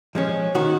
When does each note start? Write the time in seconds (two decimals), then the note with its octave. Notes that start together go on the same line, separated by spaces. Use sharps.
0.15 F3 G#3 C#4
0.55 D#3 F#4